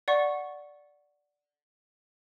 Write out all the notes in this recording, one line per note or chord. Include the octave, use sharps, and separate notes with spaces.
D5 F#5 C#6